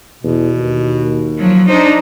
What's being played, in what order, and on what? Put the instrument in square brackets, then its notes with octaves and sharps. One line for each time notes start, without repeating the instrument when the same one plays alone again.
[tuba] E2 [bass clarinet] B2
[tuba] D#2
[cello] F3 F#3
[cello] D4 D#4 [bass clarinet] C5